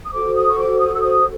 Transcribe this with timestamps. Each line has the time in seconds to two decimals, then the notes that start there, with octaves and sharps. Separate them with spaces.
0.05 D#6
0.12 F#4 A4 C5 D6
0.35 D#6
0.48 C#6
0.57 D6
0.79 D#6
0.94 E6
1.01 D#6